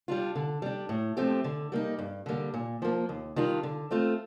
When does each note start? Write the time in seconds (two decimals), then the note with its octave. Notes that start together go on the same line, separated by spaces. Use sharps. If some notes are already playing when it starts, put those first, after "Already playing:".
0.08 G3 D4 F4
0.36 D3
0.62 G3 D4
0.89 A2
1.17 F3 A3 C4 G4
1.44 D3
1.72 G3 A#3 D#4
1.99 G2
2.26 D3 G3 A#3
2.54 A#2
2.82 F3 A#3
3.09 D#2
3.36 D#3 G3 D4 F4
3.63 D3
3.91 A3 C4 F4